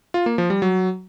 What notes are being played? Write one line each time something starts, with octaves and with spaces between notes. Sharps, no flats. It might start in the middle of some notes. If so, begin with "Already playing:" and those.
F4
A#3
F3
G3
F#3